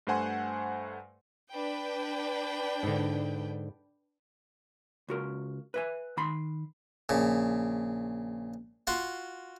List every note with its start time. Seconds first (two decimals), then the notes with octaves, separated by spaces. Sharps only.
0.07 G2 A3 C5 F#5 G#5 C6
1.50 D4 B4 G5
2.83 G#2 D3
5.08 C#2 F#4 A#4
5.74 B4 E5 G#5
6.17 D#3 B5 C6
7.09 A#1 C#3
8.87 F4 F#4 C6